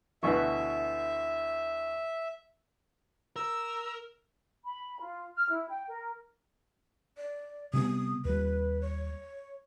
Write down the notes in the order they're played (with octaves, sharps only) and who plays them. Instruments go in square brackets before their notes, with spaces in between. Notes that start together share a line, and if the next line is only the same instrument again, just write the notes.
[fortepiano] D2 B2 E3 [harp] B4 C#6 [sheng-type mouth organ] E5
[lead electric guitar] A#4 [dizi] E6
[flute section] B5
F4
F6
E4
G5
A#4
[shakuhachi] D5
[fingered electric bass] C3 G3 B3 [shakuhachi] D#6
[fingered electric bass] D#2 G3 [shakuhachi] B4
[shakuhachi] C#5